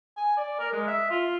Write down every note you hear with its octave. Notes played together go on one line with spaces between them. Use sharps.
G#5
D5
A#4
G#3
E5
F4